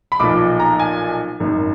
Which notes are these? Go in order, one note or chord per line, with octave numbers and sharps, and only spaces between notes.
B5
B1 A#2 F3 D6
A#5
G#5
G#1 F#2 D#3